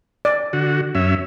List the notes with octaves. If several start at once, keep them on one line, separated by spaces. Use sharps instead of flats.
D5
D3 F#4
F#2 C#4 E5